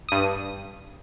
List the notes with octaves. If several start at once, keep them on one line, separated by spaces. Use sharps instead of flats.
G2 D#6